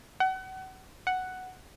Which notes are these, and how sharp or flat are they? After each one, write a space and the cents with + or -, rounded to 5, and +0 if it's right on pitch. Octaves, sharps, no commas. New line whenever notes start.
F#5 +35
F#5 +5